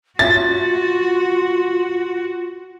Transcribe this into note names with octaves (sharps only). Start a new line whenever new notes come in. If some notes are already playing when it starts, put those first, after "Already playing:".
F4 F#4 A6